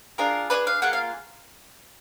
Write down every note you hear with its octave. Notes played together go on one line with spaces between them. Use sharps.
D4 F4 G#4 A#4
D4 F4 G#4 B4
F5
A#3 F4 G#4 F#5
F5